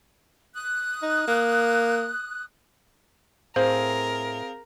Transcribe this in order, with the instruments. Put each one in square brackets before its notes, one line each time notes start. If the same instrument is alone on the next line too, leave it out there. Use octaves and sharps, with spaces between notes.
[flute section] D#6 F#6
[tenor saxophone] D#4
A#3
[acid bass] A2 [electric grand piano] C4 G#4 F5 [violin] A#4 [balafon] C5